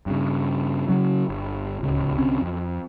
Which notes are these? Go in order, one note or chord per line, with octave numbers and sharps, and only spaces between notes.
G2 C#3
C#3 F#3 C#4
G1
D1 C#2 C#3
C2 D3 C4 C#4
F2